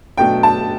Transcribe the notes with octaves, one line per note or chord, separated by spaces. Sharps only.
B2 F#3 A3 D4 G5
A5